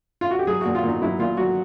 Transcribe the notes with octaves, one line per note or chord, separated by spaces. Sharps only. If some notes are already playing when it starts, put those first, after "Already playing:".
F4
F#4
G4
F#3 G#4
A#2 F#4
F4
A#2 D#4
F#3 E4
A#2 F4
F#3 F#4